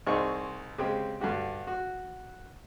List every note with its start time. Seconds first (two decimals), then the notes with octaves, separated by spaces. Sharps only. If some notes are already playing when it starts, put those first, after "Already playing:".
0.07 C2 C4 D#4 G#4 C#6
0.78 C#3 G#3 C4 G4
1.20 G2 D3 F#4 G4
1.67 F#4